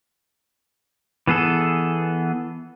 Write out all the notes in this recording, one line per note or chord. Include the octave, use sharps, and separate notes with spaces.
E3 B3 G#4 A4